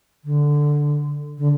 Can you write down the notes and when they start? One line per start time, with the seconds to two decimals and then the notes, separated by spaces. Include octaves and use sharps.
0.25 D3
1.38 D3